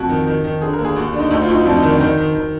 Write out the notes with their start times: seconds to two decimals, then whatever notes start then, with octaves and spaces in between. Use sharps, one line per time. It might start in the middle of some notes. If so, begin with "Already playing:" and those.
Already playing: F2 F#4
0.09 D#3
0.27 D#3
0.44 D#3
0.62 D3 G#4
0.73 A#4
0.79 D#2
0.85 G#4
0.96 D#2 F#4
1.13 D3 D4
1.20 D#4
1.31 D2 D#4
1.42 F4
1.48 D2
1.54 D#4
1.65 F2 D4
1.77 D#4
1.82 D#3
1.89 D4
2.00 D#3 D#4
2.18 D#3
2.35 D#3